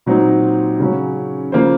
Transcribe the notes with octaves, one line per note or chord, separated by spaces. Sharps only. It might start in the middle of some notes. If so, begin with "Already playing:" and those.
A#2 F#3 C4 D#4
C#3 F#3 C#4
C#3 F3 A#3 F4 C5